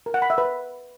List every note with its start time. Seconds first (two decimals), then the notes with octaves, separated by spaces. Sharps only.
0.06 A#4
0.14 F#5
0.22 B5
0.30 E5
0.38 B4